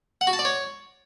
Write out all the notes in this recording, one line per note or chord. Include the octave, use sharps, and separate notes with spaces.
F#5
F#4
A5
D5
C#5